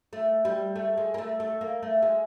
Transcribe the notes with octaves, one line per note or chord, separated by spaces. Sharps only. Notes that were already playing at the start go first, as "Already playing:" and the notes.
A3
G3
A3
G#3
A#3
A3
A3
A#3
A3
G#3